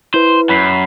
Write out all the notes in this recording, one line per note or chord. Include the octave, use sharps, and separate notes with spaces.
E4 B4 C5
F#2 B5 B6 C7